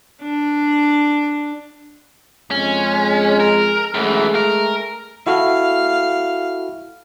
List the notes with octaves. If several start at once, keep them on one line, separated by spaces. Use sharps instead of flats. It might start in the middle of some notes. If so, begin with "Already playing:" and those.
D4
F2 G#3 C#4
A#4
F#2 E3 G#3 A3 G#4
A#4
E4 F#4 A4 F5